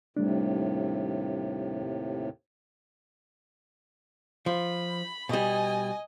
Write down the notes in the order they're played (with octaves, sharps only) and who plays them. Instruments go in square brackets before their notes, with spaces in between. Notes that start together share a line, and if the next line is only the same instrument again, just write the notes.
[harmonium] D#2 A2 C3 [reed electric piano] G3 A3 D4
[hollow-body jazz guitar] F3 [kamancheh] B5
[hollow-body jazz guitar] B2 G3 [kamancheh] D#5 G#5